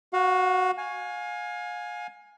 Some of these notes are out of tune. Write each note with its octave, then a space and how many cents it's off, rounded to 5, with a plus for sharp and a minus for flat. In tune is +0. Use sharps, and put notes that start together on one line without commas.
F#4 +0 F5 +35
F5 +30 G#5 +0